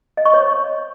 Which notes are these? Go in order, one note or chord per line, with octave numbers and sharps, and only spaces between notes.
D#5
C#6
C#5